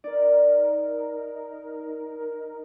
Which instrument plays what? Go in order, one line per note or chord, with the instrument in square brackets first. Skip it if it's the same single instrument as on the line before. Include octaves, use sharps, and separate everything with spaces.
[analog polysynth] D#4 A#4 [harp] D5